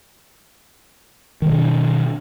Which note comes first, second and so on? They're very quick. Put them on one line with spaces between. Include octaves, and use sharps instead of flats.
D#3 G3 B2 D4